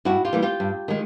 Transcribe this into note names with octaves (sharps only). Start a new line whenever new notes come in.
G2 E4 F#4
F4 G4
E3 G3 A#3
F4 G4
G2
D#3 G#3